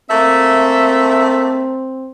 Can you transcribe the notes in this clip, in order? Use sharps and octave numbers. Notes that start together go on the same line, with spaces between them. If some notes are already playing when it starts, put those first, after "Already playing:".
A3 A#3 C4 E5